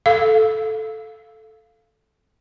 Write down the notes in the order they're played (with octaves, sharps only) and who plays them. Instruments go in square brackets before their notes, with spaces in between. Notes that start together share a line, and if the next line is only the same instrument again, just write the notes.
[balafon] A4 F5